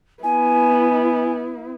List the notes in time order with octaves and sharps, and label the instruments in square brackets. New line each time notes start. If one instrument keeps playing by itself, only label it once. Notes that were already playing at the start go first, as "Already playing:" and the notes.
[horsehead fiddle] B3 E4 [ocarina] G#5